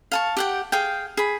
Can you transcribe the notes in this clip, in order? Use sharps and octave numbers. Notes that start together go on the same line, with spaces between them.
F5 A5 C#6
G4 F#5 G5
G#4 F5 G5
G#4 B5